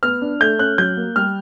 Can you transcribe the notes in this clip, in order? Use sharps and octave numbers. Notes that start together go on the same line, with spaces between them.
B3 F6
D4
A3 G6
C#4 F#6
F#3 G6
A#3
G3 F6